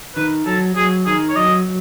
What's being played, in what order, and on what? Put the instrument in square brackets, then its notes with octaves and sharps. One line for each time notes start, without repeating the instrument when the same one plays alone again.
[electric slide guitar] D#3 [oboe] B4
[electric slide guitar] F#3 [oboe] A4
[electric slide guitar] F#3 [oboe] G#4
[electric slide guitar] D#3 [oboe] G#4
[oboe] C#5
[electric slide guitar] F#3 [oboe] D#5